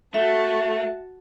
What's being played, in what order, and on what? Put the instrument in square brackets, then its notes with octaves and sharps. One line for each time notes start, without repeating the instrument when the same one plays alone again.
[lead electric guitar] A3 [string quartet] F#4 A5 [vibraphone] E5